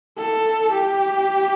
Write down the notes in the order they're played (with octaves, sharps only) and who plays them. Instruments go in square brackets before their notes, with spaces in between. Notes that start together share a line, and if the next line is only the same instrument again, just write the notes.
[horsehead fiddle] A4
G4